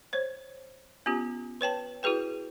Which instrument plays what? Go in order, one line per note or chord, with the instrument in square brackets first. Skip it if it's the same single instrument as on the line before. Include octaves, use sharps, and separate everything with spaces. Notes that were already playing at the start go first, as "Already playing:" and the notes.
[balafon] C5 C#5
B3 C#4 F4 G4
B4 C#5 G5 A5
E4 F#4 G#4 B4 G5